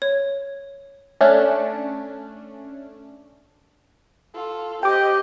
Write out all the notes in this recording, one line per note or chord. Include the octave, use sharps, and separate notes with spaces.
C#5
A3 C#4 D4
F4 A4
C4 G4 D#5 G5 D6